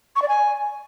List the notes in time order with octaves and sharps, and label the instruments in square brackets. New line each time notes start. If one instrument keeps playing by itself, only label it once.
[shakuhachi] C#6
D5
G#5